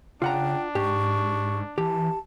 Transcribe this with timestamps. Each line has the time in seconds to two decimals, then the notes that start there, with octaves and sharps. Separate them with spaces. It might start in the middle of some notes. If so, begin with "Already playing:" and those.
0.22 C#3 D4 F4 F#5 G5 A#5
0.75 G#2 G4 C#6
1.78 E3 G4 A5